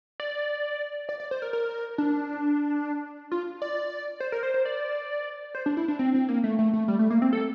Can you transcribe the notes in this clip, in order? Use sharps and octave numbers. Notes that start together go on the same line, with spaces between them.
D5
D5
D5
C5
A#4
A#4
D4
F4
D5
C5
A#4
C5
C5
D5
C5
D4
E4
D4
C4
C4
A#3
A3
A3
A3
G3
A3
A#3
C4
A4